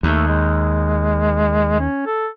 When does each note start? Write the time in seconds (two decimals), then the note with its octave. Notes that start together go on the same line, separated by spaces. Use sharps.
0.03 D#2 A3
0.28 G#3
1.80 C#4
2.06 A4